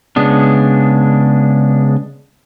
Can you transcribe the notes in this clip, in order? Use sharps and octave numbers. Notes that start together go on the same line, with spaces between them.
C#3 G#3 B3 D4